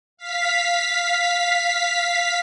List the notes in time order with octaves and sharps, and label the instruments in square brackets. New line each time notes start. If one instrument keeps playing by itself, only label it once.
[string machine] F5 B6